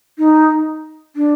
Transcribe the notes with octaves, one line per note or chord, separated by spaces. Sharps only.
D#4
D4